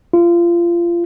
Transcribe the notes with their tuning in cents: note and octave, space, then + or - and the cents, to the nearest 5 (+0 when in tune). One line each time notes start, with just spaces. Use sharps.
F4 -25